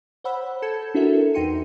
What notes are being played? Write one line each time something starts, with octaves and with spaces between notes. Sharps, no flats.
C5 C#5 F#5 B5 E6
A4 A5 G6 G#6 C#7
D4 E4 F#4 A4 A#4 E5
E2 D#4 G5 C6 C#7 D#7